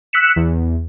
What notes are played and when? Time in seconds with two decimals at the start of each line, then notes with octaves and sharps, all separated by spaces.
0.13 E6 F#6 B6 C#7 E7
0.36 E2